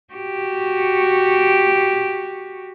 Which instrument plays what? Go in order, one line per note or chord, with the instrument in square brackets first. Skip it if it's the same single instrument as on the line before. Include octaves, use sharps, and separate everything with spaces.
[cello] F#4 G4